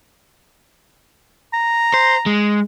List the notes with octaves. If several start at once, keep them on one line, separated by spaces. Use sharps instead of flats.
A#5
C5
G#3